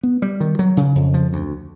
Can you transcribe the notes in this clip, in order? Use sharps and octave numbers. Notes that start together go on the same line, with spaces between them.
B3
G3
D#3
F#3
C#3
F2
F3
D2